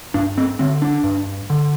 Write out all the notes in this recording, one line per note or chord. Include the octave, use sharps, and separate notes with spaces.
G2 D4
C4
D3 C4
D4
G2
D3